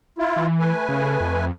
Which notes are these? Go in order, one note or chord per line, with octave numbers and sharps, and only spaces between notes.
E4 F4
E3
A3 B4 G#5
C#3
F2